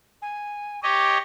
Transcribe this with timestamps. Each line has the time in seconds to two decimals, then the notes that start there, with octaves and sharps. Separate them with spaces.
0.22 G#5
0.83 G4 C#5 D#5 D6